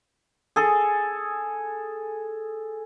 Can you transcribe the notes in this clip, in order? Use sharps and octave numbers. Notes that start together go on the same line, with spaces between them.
G#4 A4